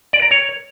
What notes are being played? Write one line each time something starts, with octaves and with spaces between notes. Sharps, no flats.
D5
A#5
C#5